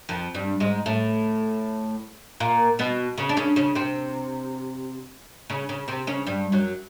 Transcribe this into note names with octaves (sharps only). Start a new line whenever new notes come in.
F2 F3
G2 G3
G#2 G#3
A2 A3
A#2 A#3
B2 B3
C#3 C#4
D4
C#3 C#4
C#3 C#4
C3 C4
C#3 C#4
C#3 C#4
C3 C4
C#3 C#4
G2 G3
F#2 F#3